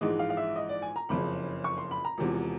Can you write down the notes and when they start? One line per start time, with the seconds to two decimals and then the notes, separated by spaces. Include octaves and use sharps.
0.01 A#1 G#2 E3 G#3 D#5
0.19 F5
0.30 F5
0.37 E5
0.56 D#5
0.69 D5
0.82 G#5
0.96 A#5
1.09 F#1 F2 C#3 B5
1.64 C#6
1.78 C6
1.91 B5
2.05 A#5
2.18 E1 E2 C3 F3